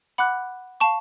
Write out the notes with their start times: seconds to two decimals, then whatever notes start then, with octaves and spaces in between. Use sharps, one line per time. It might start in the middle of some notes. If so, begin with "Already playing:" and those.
0.18 F#5 B5 D6 F#6
0.80 F5 A5 C#6